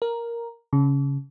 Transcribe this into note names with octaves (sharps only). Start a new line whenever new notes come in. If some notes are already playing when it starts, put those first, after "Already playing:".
A#4
C#3